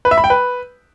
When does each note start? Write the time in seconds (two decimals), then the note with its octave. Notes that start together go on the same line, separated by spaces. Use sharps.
0.05 B4
0.11 E5
0.18 B5
0.24 G5
0.30 B4